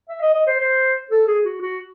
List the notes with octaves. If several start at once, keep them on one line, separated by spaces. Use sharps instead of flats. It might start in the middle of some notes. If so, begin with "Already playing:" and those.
E5
D#5
D#5
C5
C5
A4
G#4
F#4
F#4